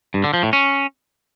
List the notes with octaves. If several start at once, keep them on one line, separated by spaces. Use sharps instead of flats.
G2
D3
F3
A2
C#4